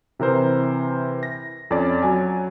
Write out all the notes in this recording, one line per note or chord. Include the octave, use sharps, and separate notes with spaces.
C3 E3 A#4 C5
A#6
F2 C#4 D5 A6
F#3 G#5